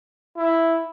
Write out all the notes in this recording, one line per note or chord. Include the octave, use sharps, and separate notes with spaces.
E4